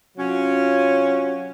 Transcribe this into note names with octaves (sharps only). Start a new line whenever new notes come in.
C3 F#3 C#4 F4